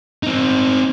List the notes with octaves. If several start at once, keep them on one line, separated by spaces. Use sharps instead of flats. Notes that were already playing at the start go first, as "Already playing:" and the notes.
C4 D#4